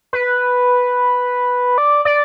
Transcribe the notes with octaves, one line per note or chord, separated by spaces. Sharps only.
B4
D5
D5